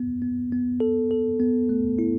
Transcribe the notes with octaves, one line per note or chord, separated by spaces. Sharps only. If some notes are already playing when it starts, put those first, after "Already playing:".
Already playing: B3
B3
B3
A4
A4
B3
A3
E4